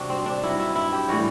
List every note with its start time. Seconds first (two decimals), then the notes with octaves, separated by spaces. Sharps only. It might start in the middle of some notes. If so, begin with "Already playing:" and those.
Already playing: C3 G3 D4 F#4
0.10 C4
0.26 D4
0.43 G2 F#3 E4
0.60 E4
0.76 E4
0.92 G4
1.09 A2 E3 G3 F#4